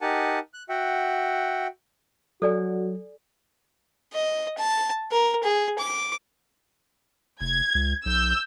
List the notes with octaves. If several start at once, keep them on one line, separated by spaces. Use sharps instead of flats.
D#4 G4 A#4 F#5 G#5 A5
F#6
F#4 E5 F#5 G5
F#3 F#4 A4 D5 G#5
D#5
A5
A#4
G#4
D6
F1 G#6
C#2
B1 E6 G6